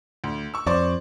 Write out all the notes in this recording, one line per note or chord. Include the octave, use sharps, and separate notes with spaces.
D2
C#6 E6
F2 C5 D5 C#6